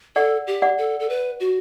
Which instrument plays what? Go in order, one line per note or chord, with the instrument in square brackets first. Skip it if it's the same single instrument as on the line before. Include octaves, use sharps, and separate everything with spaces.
[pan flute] A4 [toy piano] D5 F#5
[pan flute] G4
[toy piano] D5 F#5
[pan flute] A4
A4
B4
F#4